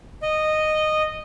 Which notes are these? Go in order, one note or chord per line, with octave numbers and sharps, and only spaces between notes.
D#5